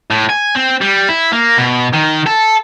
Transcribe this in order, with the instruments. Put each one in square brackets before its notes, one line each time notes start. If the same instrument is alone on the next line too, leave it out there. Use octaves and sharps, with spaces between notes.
[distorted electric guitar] A2
G#5
C4
G3
E4
A#3
B2
D#3
A4